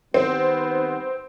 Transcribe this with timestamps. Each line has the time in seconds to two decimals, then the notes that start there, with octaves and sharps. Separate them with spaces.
0.14 D#3 G3 B3 C4